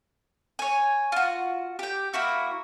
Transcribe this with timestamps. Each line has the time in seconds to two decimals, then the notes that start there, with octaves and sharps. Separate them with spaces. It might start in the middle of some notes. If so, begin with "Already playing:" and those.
0.59 C#5 G#5
1.12 F4 F#4
1.79 G4 G5
2.13 A#3 E4 F#4